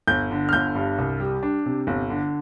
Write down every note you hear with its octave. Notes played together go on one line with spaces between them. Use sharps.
G1 G6
D3
F6
G1 G6
G2
C2
G3
D4
C3
G1
D3